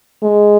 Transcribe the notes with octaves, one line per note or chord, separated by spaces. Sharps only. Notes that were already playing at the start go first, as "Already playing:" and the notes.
G#3